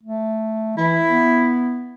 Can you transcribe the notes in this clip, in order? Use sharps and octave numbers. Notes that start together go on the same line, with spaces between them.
A3
E3 E4
B3